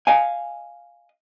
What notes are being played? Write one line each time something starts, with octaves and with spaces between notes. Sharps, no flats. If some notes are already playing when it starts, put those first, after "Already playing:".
D#5 F5 G#5